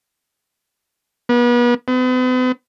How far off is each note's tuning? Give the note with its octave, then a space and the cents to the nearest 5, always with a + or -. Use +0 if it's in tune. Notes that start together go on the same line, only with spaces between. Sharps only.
B3 -35
B3 +45